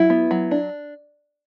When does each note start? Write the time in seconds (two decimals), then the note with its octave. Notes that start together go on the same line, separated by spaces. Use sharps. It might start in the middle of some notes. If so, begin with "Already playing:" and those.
Already playing: F#3 E4
0.10 B3
0.31 F#3
0.51 D4